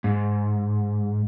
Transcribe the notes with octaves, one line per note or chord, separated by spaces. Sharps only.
G#2